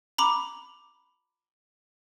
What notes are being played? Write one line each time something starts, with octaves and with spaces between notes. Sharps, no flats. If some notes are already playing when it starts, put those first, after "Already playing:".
A#5 B5 D6